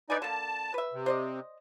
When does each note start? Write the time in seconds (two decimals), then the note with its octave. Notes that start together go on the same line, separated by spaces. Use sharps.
0.10 D4 D#4 B4 D5 G#5
0.22 D3 A#3 A5
0.74 B4 E5
0.93 C3
1.06 C5 D5 D#5